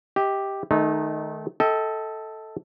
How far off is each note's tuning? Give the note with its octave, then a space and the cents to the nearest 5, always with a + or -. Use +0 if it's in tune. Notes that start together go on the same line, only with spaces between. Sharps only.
G4 +0 D#5 +40
D#3 -5 A3 -30 D#4 -10
A4 +0 D#5 +35 G5 +5